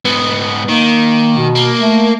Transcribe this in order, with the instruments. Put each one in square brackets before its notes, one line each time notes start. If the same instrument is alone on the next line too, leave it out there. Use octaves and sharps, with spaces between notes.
[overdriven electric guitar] G#2 B3
[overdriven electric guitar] D#3 [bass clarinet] A#3
[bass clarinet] B2
[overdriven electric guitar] A#3
[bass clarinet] A3